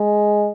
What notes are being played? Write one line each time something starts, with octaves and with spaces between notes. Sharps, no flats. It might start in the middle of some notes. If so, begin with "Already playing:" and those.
Already playing: G#3